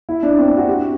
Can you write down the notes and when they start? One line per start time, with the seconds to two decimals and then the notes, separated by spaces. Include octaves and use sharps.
0.09 E4
0.23 D4
0.38 C4
0.47 D4
0.57 F#4
0.68 G4